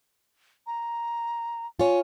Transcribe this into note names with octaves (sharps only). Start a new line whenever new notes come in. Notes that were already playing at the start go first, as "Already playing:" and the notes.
A#5
F4 C#5 G#5